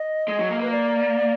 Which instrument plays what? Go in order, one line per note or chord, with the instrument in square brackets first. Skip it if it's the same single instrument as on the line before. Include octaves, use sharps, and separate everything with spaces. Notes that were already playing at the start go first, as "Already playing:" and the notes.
Already playing: [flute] D#5
[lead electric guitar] G#3
F#3
A#3
[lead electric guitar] A#3 [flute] B4
[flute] D5